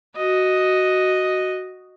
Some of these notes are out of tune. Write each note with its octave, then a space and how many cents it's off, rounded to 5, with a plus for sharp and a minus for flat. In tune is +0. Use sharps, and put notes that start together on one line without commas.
F#4 +5 D#5 +0